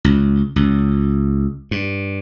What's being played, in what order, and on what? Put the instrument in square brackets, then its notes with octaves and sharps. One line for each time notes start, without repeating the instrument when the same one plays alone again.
[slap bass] C#2
C#2
G2